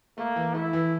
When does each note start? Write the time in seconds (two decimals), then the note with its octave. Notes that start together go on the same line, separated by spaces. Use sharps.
0.18 A3 A#3
0.36 E3
0.54 A3 E4
0.73 E3